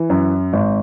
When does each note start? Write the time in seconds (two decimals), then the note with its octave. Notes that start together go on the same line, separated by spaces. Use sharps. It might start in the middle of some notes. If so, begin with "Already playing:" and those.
Already playing: E3
0.09 F#2
0.53 G#1